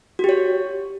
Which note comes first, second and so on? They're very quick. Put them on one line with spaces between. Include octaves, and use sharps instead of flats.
F#4 G4 C#5